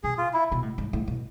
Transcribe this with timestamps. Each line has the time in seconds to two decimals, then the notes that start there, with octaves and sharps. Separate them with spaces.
0.04 B2 G#4
0.18 F4
0.34 E4
0.52 B2
0.63 A2
0.78 G#2
0.93 A2
1.08 B2